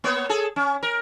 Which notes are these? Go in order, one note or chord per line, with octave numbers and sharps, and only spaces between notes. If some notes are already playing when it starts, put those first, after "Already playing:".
A#3 B3 C#5
G#4 A4
C#4
A#4